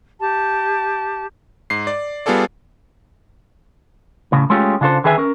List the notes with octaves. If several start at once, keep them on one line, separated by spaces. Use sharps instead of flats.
G4 A5
G#2 C7
D5
G3 B3 F4 G#4 A4 D5
A2 C#3
G#3 A3 C#4 F4 G4
C#3 D4 F4 A4 C5
D3 D#3 G#4 B4 E5 G#5
C#4 A#4